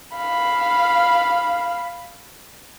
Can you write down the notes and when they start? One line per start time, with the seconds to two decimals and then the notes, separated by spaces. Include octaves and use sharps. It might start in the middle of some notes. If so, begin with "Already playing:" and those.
0.16 F5 B5